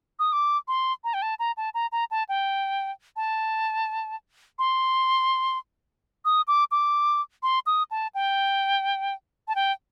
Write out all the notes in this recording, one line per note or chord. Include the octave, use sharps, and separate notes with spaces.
D#6
D6
C6
A#5
G5
A5
A#5
A5
A#5
A#5
A5
G5
A5
C6
D#6
D6
D6
C6
D#6
A5
G5
A5
G5